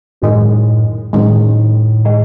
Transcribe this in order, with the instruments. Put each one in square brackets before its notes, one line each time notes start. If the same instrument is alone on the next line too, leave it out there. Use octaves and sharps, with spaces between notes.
[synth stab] F#2 D#3 G#3 [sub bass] A2
[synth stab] F#2 D#3 G#3 [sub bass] A2
[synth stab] D#3 G#3